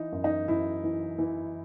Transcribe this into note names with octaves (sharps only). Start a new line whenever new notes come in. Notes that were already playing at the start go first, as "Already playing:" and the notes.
Already playing: E3 D#4
F#2
D#4
F#2 E4
E3
E3